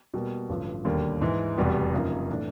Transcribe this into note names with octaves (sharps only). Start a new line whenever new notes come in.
B2 G3 A#3
A1 G2 D3 F3
E1 D#2 D3 G3 A#3
G#2 E3 G#3
F1 E2 B2 G3 B3
F#2 C#3 F3 A#3 D#4
A2 E3 A3 D4